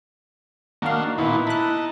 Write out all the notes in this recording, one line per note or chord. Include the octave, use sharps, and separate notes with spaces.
D#3 A#3 D4 F#4 F5
A#2 D#3 B3 E4
D#4 A5 B5 F#6